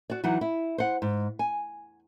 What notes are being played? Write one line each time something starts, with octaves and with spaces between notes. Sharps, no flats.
F#4 D5
E3 F#3 D#4 F#5
E4
C5 F#5
G#2
G#5